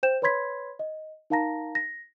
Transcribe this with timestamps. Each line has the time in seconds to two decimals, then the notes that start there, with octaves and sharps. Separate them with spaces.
0.03 C5 G5 G6 E7
0.22 B4 C#5 B5 C6 G#6 B6
0.79 D#5
1.30 D#4 A#4 F5 A5 A#5 A#6
1.75 A#6